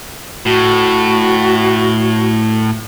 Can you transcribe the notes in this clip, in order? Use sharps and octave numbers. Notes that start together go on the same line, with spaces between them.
A2 F#4